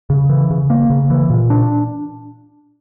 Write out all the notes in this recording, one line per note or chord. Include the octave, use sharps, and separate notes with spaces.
C#3
E3
C#3
A#3
C#3
E3
A#2
D4